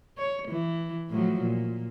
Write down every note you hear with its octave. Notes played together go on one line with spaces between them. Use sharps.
C#5
E3
A2 F3 F#3
A#2